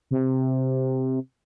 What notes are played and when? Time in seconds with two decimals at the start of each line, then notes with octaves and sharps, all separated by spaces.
0.11 C3